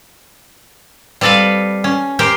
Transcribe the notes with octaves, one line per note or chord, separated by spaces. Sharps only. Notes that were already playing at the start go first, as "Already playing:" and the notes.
G3 C4 A4 B4 F5
C#4
G4 A#4 C5 G5